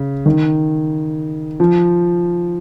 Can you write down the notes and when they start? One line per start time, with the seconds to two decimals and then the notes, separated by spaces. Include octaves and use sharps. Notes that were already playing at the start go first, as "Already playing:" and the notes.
Already playing: C#3
0.26 D#3
1.60 F3